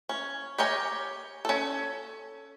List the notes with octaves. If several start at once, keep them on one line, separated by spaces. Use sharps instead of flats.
C#4
G4 A#4 C#5 G5 G#5
C#4 A4